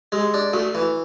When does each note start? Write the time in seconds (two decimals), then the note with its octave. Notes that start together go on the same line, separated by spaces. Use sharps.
0.12 G#3 G4
0.34 D4
0.53 A3 F#4
0.75 E3